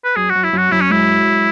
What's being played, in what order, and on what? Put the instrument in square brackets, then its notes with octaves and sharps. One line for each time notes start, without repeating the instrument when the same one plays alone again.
[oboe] B4
[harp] F#2 [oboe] G#4
[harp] F#2 [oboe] F#4
[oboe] E4
[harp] F#2 [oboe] F#4
[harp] F#2 [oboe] E4
[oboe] C#4
[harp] G#3 [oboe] E4